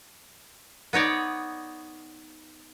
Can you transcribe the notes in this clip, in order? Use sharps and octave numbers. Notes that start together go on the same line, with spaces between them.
B3 D#4 C#5 D5